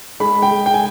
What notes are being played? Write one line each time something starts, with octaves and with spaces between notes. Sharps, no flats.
G#3 B5
G5
G#3
G5
G#5